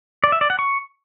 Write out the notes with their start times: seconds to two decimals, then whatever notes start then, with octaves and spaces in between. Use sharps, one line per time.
0.24 D5
0.32 E5
0.41 D5
0.50 F#5
0.59 C#6